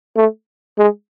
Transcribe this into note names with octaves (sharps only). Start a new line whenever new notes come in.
A3
G#3